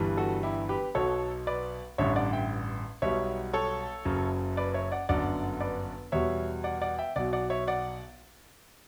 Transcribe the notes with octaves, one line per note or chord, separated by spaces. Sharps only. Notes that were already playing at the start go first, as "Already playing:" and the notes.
Already playing: G1 G2 E3 G3
F#4 A4
E4 G4
G4 B4
B1 B2 F#3 A4 C#5
B4 D5
A1 G2 D3 C#5 E5
D5 F#5
E5 G5
B1 B2 G3 C#5 E5
A4 C#5
F#1 F#2 C#3
B4 D5
C#5 E5
D5 F#5
G1 F#2 D3 D5 F#5
B4 D5
E2 B2 G3 C#5 E5
D5 F#5
D5 F#5
E5 G5
B1 B2 F#3 D5 F#5
D5 F#5
C#5 E5
D5 F#5